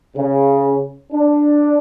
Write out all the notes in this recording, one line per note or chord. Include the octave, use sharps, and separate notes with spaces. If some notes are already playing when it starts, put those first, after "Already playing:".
C#3
D4